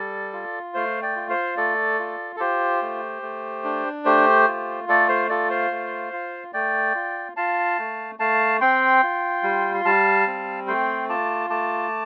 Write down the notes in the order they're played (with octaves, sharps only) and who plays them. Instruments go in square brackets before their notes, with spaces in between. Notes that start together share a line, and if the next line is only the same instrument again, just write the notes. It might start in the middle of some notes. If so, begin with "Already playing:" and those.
Already playing: [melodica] G3 A4 D5
F4
A3 C5 F5
D5 G5
F4
C5 F5
A3 A4 D5
F4
A4
F4 G4 C5
A3
A3
D4
A3 G4 C5
F4
A3 A4 D5
C5 F5
F4 A4 D5
C5 F5
A3
F4
A3 D5 G5
F4
F4 F5 A5
A3
A3 F5 A5
C4 G5 C6
F4
G3
C6
G3 F5 A5
C4
A3 G5 C6
F4 A5 D6
A3 A5 D6